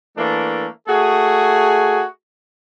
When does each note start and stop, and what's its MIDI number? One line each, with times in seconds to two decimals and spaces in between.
0.18 0.67 52
0.18 0.67 57
0.18 0.67 58
0.18 0.67 62
0.89 2.03 57
0.89 2.03 66
0.89 2.03 68